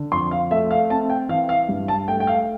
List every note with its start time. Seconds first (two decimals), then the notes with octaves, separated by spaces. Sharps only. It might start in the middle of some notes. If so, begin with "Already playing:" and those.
Already playing: D3
0.12 F2 C6
0.31 F5
0.51 A3 E5
0.71 F5
0.90 C4 A5
1.10 G5
1.29 E3 F5
1.49 F5
1.69 G2
1.88 A5
2.08 A3 G5
2.20 G5
2.27 F5